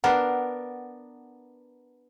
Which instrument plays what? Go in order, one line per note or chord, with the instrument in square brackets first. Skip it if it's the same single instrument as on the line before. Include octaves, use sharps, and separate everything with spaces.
[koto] B3 D4 A#4 [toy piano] F#5